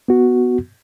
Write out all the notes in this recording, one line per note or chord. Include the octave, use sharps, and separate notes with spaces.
B3 F#4